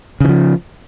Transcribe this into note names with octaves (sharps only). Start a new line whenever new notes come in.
C#3 E3 F3